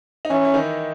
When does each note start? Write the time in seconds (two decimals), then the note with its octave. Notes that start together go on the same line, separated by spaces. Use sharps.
0.25 D#4
0.30 E3 C#4 E4
0.45 E4
0.54 D#3 D#4